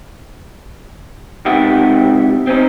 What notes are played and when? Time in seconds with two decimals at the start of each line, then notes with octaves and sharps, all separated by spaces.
1.45 C#2 C3 D#4 G4 E5 F#5
2.47 C4 C#4 D#4